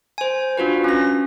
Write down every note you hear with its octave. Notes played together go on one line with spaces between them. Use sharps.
C5 G#5
D4 F4 F#4 B4
C#4 A#6